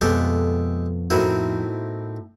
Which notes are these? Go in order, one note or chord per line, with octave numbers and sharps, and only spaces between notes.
F2 B2 G#3 A3 B3 G4 A4
A2 C4 D#4 E4 F#4 A#4